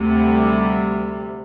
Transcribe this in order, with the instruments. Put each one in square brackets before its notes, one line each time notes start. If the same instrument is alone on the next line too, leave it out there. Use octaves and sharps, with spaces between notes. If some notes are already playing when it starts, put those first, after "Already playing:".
Already playing: [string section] D2 C3 G3